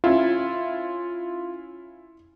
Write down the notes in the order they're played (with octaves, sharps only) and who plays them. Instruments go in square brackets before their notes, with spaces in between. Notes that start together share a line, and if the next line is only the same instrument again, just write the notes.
[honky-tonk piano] C#4 E4 [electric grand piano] F4